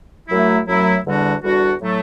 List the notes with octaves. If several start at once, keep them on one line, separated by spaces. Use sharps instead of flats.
F#2 F#3 A3 E4
F#2 F#3 A3 E4
E2 D3 G3 D4 F#4
E2 D3 G3 D4 F#4
A2 F#3 A3